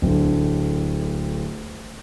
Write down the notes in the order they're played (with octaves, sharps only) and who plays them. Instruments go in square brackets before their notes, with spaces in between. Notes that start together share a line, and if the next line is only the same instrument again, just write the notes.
[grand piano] D1 D3